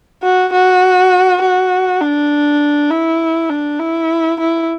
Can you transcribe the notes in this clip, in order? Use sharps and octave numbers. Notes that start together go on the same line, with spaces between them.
F#4
F#4
F#4
D4
E4
D4
E4
E4